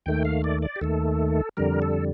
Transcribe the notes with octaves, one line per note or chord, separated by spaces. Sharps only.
D#2 D#3 A3 G5
F5
D5
D5
G4
D#2 D#3 A3 A4
F2 D3 G3 A#4
A4